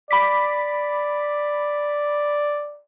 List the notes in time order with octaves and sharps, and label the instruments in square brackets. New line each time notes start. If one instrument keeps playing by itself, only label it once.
[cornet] D5 [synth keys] B5 D6 B6